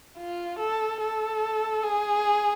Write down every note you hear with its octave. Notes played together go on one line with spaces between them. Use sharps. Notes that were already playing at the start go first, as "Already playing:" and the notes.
F4
A4
A4
G#4